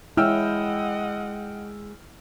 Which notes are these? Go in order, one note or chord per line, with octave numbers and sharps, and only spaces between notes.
G#3 E4 C#5 D#5 F#5 G5 E6 F6